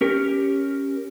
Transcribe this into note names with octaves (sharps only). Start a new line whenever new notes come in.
C#4 G4 A#4